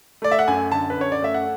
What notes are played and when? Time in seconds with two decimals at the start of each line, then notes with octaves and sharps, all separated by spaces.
0.22 A3 D5
0.31 E5
0.39 F#5
0.48 F#2 G#5
0.72 D3 A5
0.90 B4
0.98 F#2 C#5
1.12 D5
1.22 A3 E5
1.34 F#5